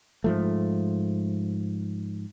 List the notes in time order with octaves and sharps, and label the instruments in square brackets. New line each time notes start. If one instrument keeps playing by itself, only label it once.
[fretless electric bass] G#2 F3 A3